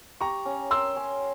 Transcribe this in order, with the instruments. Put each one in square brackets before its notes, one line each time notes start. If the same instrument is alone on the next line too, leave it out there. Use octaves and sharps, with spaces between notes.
[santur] G4 [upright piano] A#5 C#6
[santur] C#4
[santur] A#4 [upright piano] C6 E6
[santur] C#4